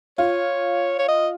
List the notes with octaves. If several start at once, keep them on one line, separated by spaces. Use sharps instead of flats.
F4 C#5
C#5
D#5